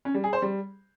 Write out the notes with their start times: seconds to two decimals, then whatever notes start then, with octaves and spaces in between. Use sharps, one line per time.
0.05 C#4
0.14 G3
0.24 G#4
0.33 C5
0.42 G3